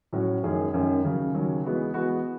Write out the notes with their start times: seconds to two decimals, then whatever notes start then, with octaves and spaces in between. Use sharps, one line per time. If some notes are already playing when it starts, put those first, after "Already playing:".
0.13 A2 F#3 C#4 F#4
0.43 F#2 D#3 G#3 C#4 G#4
0.74 F#2 D#3 G#3 C#4 G#4
1.03 D#2 C#3 F#3
1.34 D#2 C#3 F#3
1.64 E3 G#3 B3 F#4
1.94 E3 G#3 B3 F#4